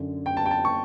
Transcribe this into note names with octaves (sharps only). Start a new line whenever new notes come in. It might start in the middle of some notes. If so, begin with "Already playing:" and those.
Already playing: F#2 D3
G5
A5
G5
A5
C#6